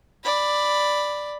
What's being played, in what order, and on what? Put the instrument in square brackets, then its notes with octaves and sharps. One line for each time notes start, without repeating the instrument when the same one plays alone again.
[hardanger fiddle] D5 B5